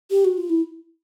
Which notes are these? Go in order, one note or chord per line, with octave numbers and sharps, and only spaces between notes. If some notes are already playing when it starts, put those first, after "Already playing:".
G4
F#4
F4
E4